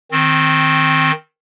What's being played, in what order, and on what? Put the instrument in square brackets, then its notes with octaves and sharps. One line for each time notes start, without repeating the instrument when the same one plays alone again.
[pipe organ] D#3 C4